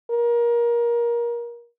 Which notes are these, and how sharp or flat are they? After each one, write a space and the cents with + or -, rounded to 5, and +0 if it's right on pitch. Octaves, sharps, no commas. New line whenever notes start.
A#4 +25